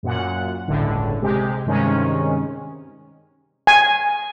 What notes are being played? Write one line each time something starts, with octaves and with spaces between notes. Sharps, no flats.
F#2 A#2 F#5
G1 C#2 A2 D3
C3 G#3 G4
G2 C3 D#3 G#3 C#4
G#5